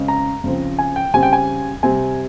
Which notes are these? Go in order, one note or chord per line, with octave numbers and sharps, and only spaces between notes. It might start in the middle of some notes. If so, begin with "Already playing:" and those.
Already playing: C#3 G#3 C4
A#5
C#3 F3 C4
G#5
G5
C#3 G3 C4 G#5
G5
G#5
C3 G3 C4 G#5